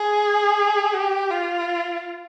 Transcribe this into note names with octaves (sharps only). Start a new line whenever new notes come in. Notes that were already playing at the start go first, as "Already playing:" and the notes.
Already playing: G#4
G4
F4